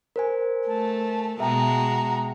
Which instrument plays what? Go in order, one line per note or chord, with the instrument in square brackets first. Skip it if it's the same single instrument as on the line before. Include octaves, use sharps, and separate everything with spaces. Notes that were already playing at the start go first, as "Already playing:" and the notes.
[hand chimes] A#4 C5 G#5
[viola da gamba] A3 [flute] A5
[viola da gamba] B2 G#3 F#4 [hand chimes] E5 G5 A5 [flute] A#5